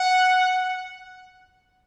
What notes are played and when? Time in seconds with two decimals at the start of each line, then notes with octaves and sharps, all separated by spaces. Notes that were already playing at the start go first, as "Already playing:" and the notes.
Already playing: F#5